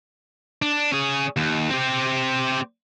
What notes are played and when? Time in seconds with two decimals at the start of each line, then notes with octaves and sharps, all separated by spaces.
0.62 D4
0.92 C#4 G#4
1.37 D#2
1.70 C4 G4